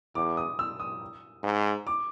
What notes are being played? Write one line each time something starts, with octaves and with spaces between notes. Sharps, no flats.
E2 D6
D#6
E6
D#6
G#2
D6